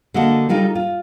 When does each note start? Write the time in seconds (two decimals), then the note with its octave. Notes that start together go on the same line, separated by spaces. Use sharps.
0.14 D3 A#3 F#4 D#5 F#5 A5
0.49 C#3 G3 D#4 F4 A4
0.75 F4